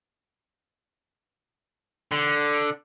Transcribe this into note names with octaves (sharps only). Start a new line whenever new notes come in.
D3